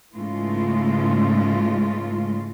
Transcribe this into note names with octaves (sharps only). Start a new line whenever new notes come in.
G#2 C#3 E3 G#3 A3 F4